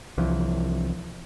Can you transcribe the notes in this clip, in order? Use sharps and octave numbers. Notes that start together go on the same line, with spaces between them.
C2 E3 F3